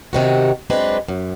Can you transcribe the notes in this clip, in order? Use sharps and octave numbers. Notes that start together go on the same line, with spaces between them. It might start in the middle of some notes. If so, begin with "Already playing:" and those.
C3 D#3 F#4
F#2 G#3 C4 D4 B4
F#2